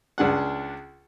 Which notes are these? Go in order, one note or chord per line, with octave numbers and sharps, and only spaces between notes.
C#2 D4 G#4 F#5